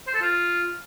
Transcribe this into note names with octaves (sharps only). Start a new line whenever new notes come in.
C5
A4
F4